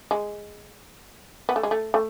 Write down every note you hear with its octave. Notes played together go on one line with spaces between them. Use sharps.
G#3
B3
A3
G#3
A3
A3